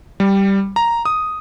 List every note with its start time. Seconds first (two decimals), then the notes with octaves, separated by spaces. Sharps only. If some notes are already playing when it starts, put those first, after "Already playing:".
0.20 G3
0.76 A#5
1.05 D#6